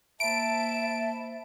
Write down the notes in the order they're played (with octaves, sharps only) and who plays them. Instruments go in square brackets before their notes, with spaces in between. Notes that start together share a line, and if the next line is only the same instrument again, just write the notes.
[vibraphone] A#3 C5 B5 [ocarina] E5 [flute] A5 [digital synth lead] D7